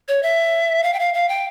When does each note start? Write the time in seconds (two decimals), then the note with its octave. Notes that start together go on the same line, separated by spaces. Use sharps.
0.08 C#5
0.23 E5
0.84 F5
0.94 G5
0.99 F5
1.14 F5
1.29 G5